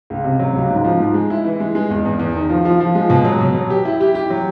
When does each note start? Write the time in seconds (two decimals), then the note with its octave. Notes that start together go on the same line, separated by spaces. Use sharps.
0.10 C#2
0.24 C3
0.39 F#3
0.55 C#2
0.70 G#2
0.85 F3
1.00 G#2
1.14 G#3
1.30 E4
1.45 E3
1.60 G#3
1.75 G#3
1.90 E2
2.05 E2
2.19 E2
2.35 D#3
2.50 F3
2.65 F3
2.80 F3
2.95 G#3
3.10 B2
3.25 F#3
3.41 B2
3.54 F#3
3.70 G4
3.85 E4
4.01 G4
4.15 G4
4.30 F#3